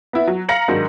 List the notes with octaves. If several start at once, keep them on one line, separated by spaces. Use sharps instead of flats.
B3 E4
F#3
F5 A#5 A#6 C#7 F#7
G#2 D#3 F#3 D4